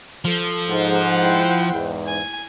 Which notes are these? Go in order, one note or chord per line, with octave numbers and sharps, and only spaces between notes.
F3 A4
G#2 C5 F#5
E4 G5
E2 G#2
G#5